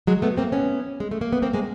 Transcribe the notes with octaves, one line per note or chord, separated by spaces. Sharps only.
F#3 G#3
A3 B3
A#3 C4
B3 C#4
G#3
A3
A#3
B3
A#3 C4
G#3 A#3